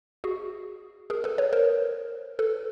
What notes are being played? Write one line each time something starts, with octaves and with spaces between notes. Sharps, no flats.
F#4 G#4
G#4 A#4
A4 B4
B4 C#5
A#4 C5
A4 B4